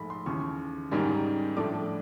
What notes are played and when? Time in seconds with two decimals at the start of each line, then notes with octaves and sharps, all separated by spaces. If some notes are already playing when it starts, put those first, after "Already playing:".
Already playing: A#1 G#2 F3 A3 B5
0.10 C6
0.26 D#2 C#3 E3 C#6
0.91 G#2 D#3 G3 A#3 C#4
1.57 A2 F3 A3 D4 D6